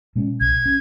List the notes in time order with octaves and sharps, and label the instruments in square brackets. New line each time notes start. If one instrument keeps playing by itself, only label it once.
[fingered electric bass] B2 G#3 C#4
[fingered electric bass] B1 [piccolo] G#6
[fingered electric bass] C#4